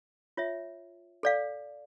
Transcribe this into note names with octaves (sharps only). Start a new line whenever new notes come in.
F4 C#5 E5
A4 D5 F5